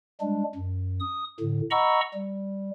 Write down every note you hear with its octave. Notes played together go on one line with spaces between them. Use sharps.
G3 G#3 D4
F#2
D#6
A2 D3
D#5 F#5 A#5 B5 C#6 E6
G3